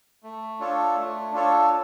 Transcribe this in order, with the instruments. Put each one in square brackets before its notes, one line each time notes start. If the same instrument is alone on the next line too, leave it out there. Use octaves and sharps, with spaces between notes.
[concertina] A3
D4 F4 A4 C#5
A3
D4 F4 A4 C#5